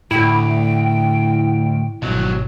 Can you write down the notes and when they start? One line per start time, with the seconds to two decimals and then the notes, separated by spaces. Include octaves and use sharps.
0.11 D2 A2 E4 G5
2.02 G#1 F2 B2 F#3